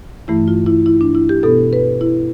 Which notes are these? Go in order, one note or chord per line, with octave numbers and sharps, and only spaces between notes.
G2 E3 A3 E4
F4
E4
E4
D4
E4
G4
B2 B3 A4
B4
E4